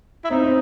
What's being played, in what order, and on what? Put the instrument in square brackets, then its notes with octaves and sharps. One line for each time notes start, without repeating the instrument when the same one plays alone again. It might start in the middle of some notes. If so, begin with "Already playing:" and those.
[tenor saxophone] E4
[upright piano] C4 [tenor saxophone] D#4
[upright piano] C4